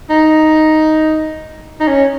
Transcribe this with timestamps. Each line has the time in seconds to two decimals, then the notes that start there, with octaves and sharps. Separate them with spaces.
0.10 D#4
1.80 D#4
1.87 C#4